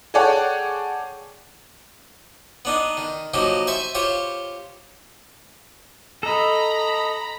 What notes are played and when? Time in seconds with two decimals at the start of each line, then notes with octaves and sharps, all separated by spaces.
0.14 G#4 A4 C#5 D5 F#5 G5
2.65 B3 D4 D#4
2.97 D#3
3.34 F3 F#3 A#3 D#4 G4
3.67 C5 E5 G#5 C#6
3.95 F4 G4 C5 C#5
6.23 A4 D#5 A#5 B5